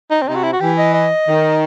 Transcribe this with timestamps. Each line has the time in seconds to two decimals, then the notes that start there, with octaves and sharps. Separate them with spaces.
0.11 D#4
0.22 C4
0.27 C3 D#4
0.35 F#4
0.44 E4
0.53 F#4
0.60 E3 G4
0.78 D#5
0.94 D#5
1.28 D#3